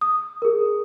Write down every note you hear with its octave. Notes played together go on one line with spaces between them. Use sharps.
D#6
G#4 A#4